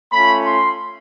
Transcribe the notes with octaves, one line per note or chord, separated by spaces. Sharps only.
A3 C#4 F4 B5
C6